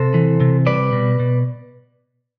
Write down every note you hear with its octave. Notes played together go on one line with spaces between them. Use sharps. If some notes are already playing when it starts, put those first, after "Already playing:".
Already playing: C3 A4 C5
E3
C3
G3 B4 D5
B2
B2